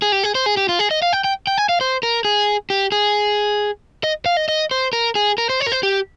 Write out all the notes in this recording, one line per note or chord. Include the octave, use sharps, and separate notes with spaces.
G#4
G4
G#4
C5
G#4
G4
F4
G#4
D#5
F5
G5
G5
G5
G#5
F5
C5
A#4
G#4
G4
G#4
D#5
F5
D#5
D#5
C5
A#4
G#4
A#4
C5
C#5
A#4
C5
G4